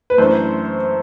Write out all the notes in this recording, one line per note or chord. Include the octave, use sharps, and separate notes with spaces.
B4
F#2 E3 A3 D4 C5